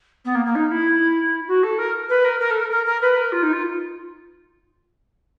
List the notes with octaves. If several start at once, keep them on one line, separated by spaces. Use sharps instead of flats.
B3
A#3
A#3
D#4
E4
F#4
A4
A#4
B4
A#4
A#4
A4
A#4
A#4
A#4
B4
A#4
F4
D#4
F4